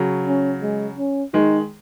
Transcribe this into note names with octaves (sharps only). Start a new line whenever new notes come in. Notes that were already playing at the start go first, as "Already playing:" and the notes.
Already playing: C#3 F#3
C#4
G#3
C#4
D#3 G#3 D#4